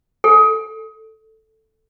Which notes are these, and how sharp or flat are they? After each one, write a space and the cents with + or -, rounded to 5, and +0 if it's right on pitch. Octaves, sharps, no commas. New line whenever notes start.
A4 +0